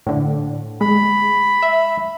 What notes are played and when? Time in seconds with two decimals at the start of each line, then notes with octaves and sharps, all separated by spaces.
0.06 A2 D3
0.81 G#3 B5
1.62 E5